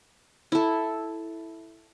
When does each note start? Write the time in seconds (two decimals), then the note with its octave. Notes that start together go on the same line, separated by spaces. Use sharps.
0.52 E4 A4